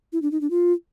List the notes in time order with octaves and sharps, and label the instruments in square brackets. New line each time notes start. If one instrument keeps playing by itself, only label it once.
[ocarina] E4
D4
D#4
D4
F4